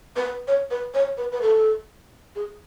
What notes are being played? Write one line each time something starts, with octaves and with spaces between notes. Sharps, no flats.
B4
C#5
B4
C#5
B4
B4
A4
G#4